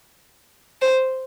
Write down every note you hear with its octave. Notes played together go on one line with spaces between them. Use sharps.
C5